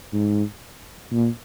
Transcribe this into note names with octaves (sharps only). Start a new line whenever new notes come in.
G#2
A#2